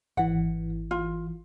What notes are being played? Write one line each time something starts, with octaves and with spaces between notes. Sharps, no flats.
G#1 E3 F#5
F4